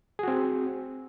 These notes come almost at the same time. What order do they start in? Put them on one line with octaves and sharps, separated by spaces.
G#4 F#4 C4